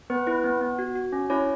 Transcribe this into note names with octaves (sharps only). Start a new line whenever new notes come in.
B3 B4
E4 B4
B3
B3
F#4
F#4
C#4
C#4 E4 C#5